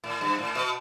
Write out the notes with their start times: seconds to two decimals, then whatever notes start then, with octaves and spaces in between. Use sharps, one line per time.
0.04 A2
0.21 G2
0.38 A2
0.55 B2